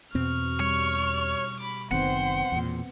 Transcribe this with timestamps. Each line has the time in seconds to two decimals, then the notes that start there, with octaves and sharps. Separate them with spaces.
0.15 E2 B2 C4 C#6 F6
0.60 G3 C#5
1.60 B5 D6
1.91 F#1 D#3 B3 C4 C5 F#5 C6
2.52 E2 A#2